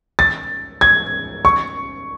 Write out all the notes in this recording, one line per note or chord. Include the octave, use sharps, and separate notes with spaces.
A6
G#6
C#6